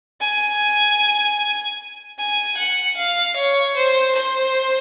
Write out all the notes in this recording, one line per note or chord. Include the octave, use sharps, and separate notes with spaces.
G#5
G#5
F#5
F5
C#5
C5
C5